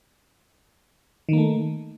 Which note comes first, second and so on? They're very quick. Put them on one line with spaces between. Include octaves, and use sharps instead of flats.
D#3 A#3 A3